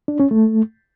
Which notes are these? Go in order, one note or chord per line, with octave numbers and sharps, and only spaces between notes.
D4
C#4
A3